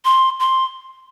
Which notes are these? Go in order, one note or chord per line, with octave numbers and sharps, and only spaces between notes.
C6
C6